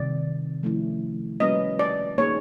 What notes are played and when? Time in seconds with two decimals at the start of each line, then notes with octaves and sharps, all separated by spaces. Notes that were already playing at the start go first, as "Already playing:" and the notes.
Already playing: C3 D#3 G3 D5
0.63 F3 A3 C#4 E4
1.40 G3 A#3 C#4 F#4 B4 D#5
1.79 D5
2.18 A#3 D#4 G#4 C#5